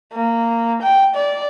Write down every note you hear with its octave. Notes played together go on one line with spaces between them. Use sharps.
A#3
G5
D5